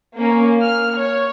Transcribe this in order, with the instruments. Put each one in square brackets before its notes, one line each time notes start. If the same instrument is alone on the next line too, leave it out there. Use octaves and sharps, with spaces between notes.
[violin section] A#3 C#4
F6
C#5